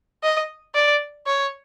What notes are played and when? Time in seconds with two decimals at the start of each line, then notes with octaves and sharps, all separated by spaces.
0.23 D#5
0.75 D5
1.26 C#5